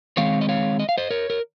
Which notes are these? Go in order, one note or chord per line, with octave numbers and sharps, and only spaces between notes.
D#3 G#3 C4 C#5 F5
D#5
C#5 F5
D#5
F5
C5 D#5
A#4 C#5
A#4